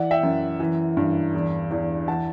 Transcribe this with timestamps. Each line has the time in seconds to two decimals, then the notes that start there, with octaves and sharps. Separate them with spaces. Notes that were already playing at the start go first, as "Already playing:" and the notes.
Already playing: E3 D5 F#5
0.11 E5 G5
0.23 F#2
0.60 E3
0.97 G2
1.34 E2
1.71 E2
2.08 E3 F#5 A5